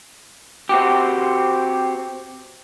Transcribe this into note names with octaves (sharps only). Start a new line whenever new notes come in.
C4 F#4 G4